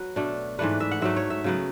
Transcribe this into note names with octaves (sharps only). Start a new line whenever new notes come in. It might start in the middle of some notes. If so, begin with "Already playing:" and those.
Already playing: F#3 B4
B2 A3 D4
G#2 E3 A3 D4 B4
E5
F#5
G#2 F#3 A3 E5
C#5
E5
C#3 F#3 B3